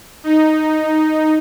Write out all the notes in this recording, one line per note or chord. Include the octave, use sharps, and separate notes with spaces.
D#4